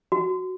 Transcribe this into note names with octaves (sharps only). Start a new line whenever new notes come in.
F#4